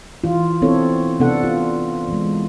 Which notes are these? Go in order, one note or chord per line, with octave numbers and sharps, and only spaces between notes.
E3 F4
B3 C4 D4 E4 A4 C#5
C3 B3 D4 A4 F#5
F4
E3 G#3